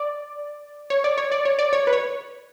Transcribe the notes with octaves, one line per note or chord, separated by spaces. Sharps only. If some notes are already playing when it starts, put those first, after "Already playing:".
Already playing: D5
C#5
D5
C#5
D5
C#5
D5
C#5
B4
C#5